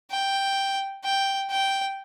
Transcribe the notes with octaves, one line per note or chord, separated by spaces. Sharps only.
G5
G5
G5